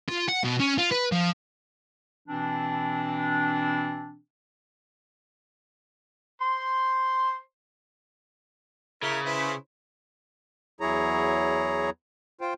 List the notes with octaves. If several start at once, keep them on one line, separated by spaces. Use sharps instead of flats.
F4
F#5
B2
C#4
F4
B4
F3
B2 E3 C4 D4
C5 C6
C#3 E4 A#4
E4 B4 C5
E2 F#3 E4 G#4 C#5 A#5
F4 C5 G5